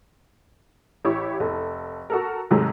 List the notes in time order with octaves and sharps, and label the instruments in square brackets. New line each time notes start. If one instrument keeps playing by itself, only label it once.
[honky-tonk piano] A1 E4 G4 C#5 C#6
F1 A4
F#4 A4 A#4
G#2 C3 D#3 F#3 G#3 A3